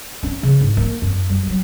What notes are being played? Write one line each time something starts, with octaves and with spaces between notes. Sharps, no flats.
C#4
C#3
G#2
A#3
F#2
G3
F#3